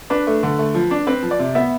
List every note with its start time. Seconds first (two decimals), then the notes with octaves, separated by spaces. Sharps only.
0.10 D4 B4
0.27 A3
0.43 D3
0.59 A3
0.75 F3
0.91 D4
1.07 C4 B4
1.23 F3
1.31 D5
1.39 C3
1.55 B3 E5